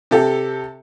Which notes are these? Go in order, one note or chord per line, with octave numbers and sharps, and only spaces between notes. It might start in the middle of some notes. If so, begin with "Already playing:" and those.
C3 G4 A4